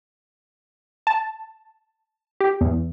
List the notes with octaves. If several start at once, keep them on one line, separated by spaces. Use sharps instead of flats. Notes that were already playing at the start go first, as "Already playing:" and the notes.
A5
G4
E2